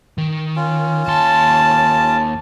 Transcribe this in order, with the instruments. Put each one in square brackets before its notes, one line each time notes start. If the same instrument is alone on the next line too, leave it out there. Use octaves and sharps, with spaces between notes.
[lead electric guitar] D#3
[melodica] C#4 F4
[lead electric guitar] D#2 C6 [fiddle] A5